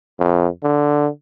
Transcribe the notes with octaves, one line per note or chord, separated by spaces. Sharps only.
F2
D3